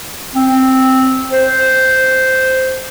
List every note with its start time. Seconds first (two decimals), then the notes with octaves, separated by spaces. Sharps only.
0.35 C4
1.32 C5